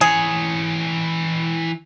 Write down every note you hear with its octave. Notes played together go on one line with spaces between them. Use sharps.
E3 G#4 C#5